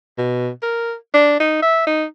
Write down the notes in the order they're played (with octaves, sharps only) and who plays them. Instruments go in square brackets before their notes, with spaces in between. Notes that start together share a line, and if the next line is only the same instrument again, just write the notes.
[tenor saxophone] B2
A#4
D4
D#4
E5
D#4